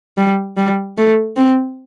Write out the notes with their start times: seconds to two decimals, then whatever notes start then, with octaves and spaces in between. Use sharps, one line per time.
0.18 G3
0.57 G3
0.98 A3
1.36 C4